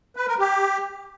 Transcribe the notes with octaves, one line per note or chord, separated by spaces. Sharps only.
B4
A#4
G4